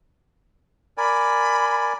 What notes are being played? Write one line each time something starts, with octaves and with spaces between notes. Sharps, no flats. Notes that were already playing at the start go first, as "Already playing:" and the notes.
A#4 D5 G#5 B5